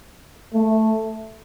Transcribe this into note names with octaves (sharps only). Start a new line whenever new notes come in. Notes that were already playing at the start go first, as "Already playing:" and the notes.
A3